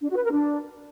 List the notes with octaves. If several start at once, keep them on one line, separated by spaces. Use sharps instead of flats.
D4
F#4
B4
A#4
D4